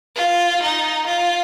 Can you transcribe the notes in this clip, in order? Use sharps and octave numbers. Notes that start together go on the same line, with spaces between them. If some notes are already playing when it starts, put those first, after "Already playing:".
F4
D#4
F4